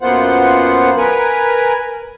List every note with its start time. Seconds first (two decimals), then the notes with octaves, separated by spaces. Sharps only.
0.01 F#2 A#3 B3 F4 C5 F#5
0.97 A#4 B4 G#5